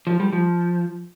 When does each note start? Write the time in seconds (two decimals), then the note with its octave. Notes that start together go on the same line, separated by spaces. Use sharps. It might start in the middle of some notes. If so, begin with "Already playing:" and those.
0.07 F3
0.20 G3
0.33 F3